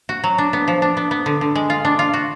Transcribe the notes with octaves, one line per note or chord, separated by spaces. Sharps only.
F#4
F#3
D4
B3
F3
D4
B3
B3
D3
D3
G#3
F4
D4
F4
F#4